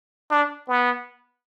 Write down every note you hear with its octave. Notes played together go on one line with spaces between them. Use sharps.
D4
B3